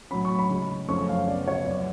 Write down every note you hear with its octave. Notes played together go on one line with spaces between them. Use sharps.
A2 F#3 C#4 B5
C#6
B5
C#3 G#3 C#4
F#2 F3 A3 C#4 C#6
F5
C#3 F3 B3 D5
C#5
F#2 F3 B3 D5